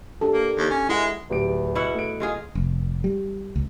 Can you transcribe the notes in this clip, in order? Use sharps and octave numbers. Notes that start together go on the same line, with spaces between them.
D4 G4 A4
A#3
D#2
C#4
G#3 E4 F#5
D1 E2 G4 D7
B2 E4 F#5
A3 D7
G#3 F4 G#4
F1
G3
C#2